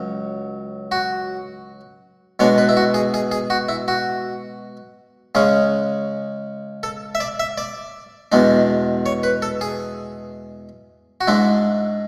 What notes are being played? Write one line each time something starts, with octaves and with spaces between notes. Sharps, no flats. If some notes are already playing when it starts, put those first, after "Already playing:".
Already playing: C#2 F#3
F#4
B2 G#3 D4 C#5
B4
E4
F#4
G#4
G#4
G#4
F#4
E4
F#4
C#3 G#3 C#4 G#4
A4
E5
D5
E5
D5
E2 B2 G#3 D4
C#5
B4
A4
G#4
F#4
G#2 G#3 D4 E4